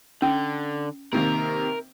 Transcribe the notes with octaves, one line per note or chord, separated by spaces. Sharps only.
D3 C#4
C3 D#3 A#3 A#4